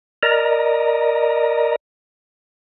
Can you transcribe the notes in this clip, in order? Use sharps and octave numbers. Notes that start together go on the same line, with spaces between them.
A#4 D5 D#5 A#5